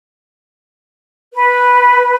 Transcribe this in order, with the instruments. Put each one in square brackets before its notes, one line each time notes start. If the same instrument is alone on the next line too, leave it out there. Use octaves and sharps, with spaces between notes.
[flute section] B4